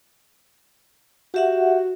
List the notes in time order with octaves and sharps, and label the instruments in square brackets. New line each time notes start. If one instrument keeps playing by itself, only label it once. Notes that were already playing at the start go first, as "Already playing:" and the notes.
[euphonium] F#4 [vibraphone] G4 E5 F#5